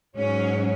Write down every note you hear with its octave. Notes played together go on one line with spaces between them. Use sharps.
G#2 F#3 C#4